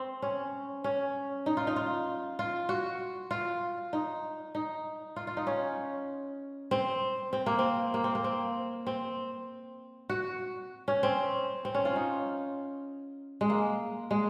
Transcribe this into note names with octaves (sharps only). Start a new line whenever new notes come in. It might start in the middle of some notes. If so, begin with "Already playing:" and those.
Already playing: C4
C#4
C#4
D#4
F4
D#4
F4
F4
F#4
F4
D#4
D#4
F4
F4
D#4
C#4
C4
C4
A#3
C4
A#3
C4
A#3
C4
C4
F#4
C#4
C4
C4
C#4
F4
D#4
G#3
A#3
G#3